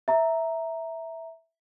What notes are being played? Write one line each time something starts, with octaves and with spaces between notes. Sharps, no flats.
E5 A#5